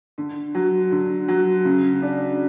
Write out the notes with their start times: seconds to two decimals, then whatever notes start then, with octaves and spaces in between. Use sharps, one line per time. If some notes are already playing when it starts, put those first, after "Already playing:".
0.18 D3
0.55 F#3
0.92 D3
1.28 F#3
1.65 C#3
2.02 D4